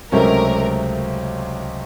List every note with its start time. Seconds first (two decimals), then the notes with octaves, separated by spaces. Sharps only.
0.12 C#2 C3 F#3 A3 C#4 A#4